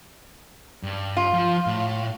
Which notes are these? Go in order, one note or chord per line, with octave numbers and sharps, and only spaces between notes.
G2
F4
F3
A2